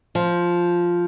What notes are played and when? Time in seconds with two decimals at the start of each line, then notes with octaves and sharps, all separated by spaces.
0.15 F3